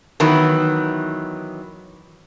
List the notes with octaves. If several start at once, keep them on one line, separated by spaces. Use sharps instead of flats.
D#3 E3 F#3 B3